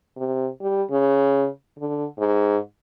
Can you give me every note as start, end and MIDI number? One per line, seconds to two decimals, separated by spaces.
0.17 0.48 48
0.61 0.82 55
0.91 1.47 49
1.79 2.05 50
2.18 2.57 44